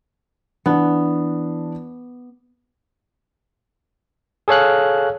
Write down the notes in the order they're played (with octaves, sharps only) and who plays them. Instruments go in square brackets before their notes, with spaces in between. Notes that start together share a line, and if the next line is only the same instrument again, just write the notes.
[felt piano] E3 D4 [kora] B3
[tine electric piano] G#4 A4 C#5 F5 F#6